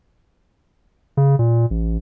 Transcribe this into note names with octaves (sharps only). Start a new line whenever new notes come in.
C#3
A#2
A1